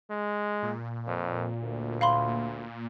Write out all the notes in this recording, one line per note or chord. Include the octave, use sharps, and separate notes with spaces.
G#3
A#2
F2
D2
F5 B5 C6